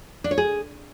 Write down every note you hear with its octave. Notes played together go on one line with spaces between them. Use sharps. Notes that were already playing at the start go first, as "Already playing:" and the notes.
D4
C#5
G#4